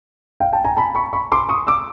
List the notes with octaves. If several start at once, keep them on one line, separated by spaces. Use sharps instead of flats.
F5 G5
G5 A5
G#5 A#5
A5 B5
B5 C#6
B5 C#6
C6 D6
C#6 D#6
D6 E6